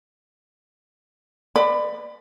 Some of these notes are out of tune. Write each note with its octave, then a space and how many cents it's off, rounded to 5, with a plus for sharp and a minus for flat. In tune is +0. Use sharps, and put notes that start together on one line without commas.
B4 +0 D5 +30 B5 +25